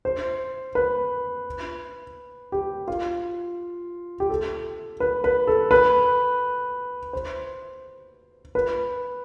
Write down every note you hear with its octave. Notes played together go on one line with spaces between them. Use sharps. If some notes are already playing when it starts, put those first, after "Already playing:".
C5
B4
G4
F4
G4
A4
B4
B4
A4
B4
C5
B4